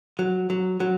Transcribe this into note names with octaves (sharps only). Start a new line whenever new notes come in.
F#3
F#3
F#3